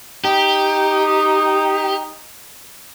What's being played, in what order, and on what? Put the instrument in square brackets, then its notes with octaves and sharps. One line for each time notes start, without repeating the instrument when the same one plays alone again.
[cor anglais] D#4 [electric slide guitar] G4